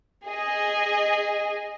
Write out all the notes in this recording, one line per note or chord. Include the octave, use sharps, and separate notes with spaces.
G#4 D#5